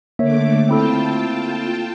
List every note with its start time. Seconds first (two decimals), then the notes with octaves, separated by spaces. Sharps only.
0.19 D3 A3 A#3 C#5 E5 D6
0.69 C4 E4 F4 A4 G5 A5